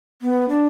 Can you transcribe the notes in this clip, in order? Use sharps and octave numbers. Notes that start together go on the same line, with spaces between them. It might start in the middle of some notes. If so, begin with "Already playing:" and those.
B3
D4